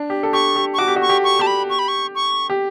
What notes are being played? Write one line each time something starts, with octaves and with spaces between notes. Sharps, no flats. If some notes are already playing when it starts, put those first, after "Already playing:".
Already playing: D4
G4
A4
G4 C#6
G4
C#6
F#4 D6
G4
F#4
C#6
G4
C#6
G4 A5
B5
C#6
B5
C#6
C#6
G4